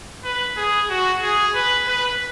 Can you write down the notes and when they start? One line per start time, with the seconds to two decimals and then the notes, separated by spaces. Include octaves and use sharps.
0.24 B4
0.57 G#4
0.89 F#4
1.22 G#4
1.55 B4
1.88 B4